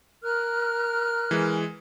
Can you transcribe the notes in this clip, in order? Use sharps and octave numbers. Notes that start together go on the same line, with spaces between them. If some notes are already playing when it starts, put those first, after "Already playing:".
A#4 F6 F#6
E3 G#3